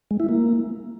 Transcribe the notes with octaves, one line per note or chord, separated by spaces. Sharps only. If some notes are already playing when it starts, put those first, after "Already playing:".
G#3
E4
A#3